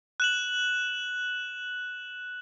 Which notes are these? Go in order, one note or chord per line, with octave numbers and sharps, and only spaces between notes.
F#6 E7 F#7